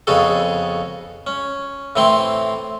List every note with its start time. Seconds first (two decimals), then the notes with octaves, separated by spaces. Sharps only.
0.07 F2 C#3 B3 F#4 G#4 A4
1.27 C#4
1.96 A2 E3 C4 E4 C6